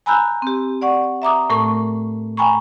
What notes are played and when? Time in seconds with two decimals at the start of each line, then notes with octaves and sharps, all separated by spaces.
0.06 G#5 A#5 B5 E6 F#6 G6
0.42 C4 G4
0.82 D5 F#5 C#6
1.22 E5 A#5 D6 D#6
1.50 A2 A3 A#4 C#6
2.37 G5 G#5 A#5 B5 C#6